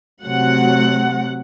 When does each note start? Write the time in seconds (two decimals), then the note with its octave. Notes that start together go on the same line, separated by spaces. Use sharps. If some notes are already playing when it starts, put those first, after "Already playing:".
0.24 C3 F#3 A3 F#5